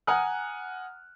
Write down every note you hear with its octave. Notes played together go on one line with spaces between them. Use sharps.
F#5 G#5 A#5 D#6 F6 F#6